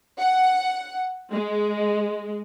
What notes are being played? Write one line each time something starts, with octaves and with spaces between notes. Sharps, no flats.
F#5
G#3